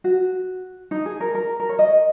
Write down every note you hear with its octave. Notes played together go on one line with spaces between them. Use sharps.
F#4
D#4
G#4
A#4
A#4
A#4
C#5
D#5